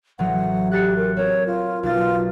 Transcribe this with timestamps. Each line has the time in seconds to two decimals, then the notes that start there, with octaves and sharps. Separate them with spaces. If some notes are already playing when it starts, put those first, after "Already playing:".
0.19 A1 F#3 F#5
0.71 G4 F#6 A6 C#7
0.97 A#4
1.16 C4 A#4 C#5
1.47 F4
1.83 B1 F4 A6